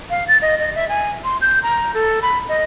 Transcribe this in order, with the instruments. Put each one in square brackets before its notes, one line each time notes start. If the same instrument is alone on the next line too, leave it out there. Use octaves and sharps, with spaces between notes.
[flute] F5
A6
D#5
D#5
E5
G#5
C6
G6
A#5
A4
B5
D#5